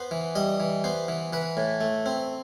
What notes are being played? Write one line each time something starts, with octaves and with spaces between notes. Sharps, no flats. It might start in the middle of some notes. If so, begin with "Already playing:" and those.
Already playing: B3 C5
E3
G3 D#5
E3
B3 C5
E3
E3 B4
A2
A3
C4